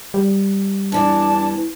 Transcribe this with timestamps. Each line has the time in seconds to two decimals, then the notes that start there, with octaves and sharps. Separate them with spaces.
0.14 G3
0.92 E2 E3 D4 A5